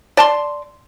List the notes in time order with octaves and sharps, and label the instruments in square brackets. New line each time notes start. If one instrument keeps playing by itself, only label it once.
[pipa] D5 A5 C6